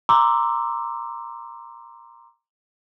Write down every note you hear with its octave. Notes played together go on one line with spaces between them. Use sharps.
A#5 C6 D6 E6